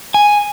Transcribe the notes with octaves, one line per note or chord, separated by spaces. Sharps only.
G#5